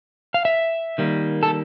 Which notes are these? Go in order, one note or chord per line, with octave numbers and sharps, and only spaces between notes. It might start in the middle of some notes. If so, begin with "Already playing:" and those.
F5
E5
D#3 G3 A#3
A4